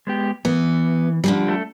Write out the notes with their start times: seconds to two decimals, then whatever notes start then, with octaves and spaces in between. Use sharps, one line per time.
0.07 G#3 B3 G4
0.45 E3 B3
1.24 D3 F3 G3
1.48 A3 A4